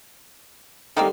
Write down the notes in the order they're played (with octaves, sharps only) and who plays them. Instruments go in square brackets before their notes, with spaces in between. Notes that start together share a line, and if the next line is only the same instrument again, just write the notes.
[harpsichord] D3 G3 [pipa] D#3 A#3 C4